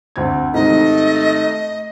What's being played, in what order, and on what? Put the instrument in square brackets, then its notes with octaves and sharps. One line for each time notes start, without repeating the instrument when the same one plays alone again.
[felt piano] D2 C4 G#6
[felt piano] G#2 C3 D#3 [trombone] A3 [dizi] D#5